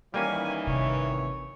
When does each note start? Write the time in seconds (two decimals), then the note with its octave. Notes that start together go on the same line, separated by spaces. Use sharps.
0.14 D#3 E3 G3 A#3 C#4 G#5
0.67 G#1 C3 C#5